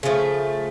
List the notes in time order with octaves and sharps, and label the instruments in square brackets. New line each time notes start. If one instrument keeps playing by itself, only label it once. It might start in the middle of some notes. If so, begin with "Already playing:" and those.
[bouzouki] C#3 F3 A3